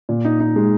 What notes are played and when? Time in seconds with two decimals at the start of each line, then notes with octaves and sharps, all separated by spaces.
0.09 A#2
0.25 D#4
0.40 D#4
0.56 G#3